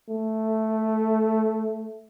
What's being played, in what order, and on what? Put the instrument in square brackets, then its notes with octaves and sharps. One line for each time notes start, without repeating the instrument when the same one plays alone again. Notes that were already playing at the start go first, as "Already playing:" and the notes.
[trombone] A3